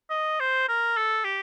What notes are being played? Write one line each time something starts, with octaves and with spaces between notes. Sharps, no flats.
D#5
C5
A#4
A4
G4